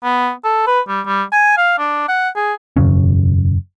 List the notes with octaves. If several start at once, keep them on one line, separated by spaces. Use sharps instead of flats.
B3
A4
B4
G3
G3
G#5
F5
D4
F#5
G#4
E1 F#2 C#3 C#4